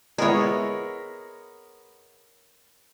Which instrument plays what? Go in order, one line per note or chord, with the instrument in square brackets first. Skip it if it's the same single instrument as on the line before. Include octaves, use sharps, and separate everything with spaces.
[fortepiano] G#3 B3 E4 [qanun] A#4 C#5